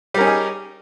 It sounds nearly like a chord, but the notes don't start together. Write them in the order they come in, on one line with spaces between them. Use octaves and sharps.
G3 A#4 C#4 D#4 G#4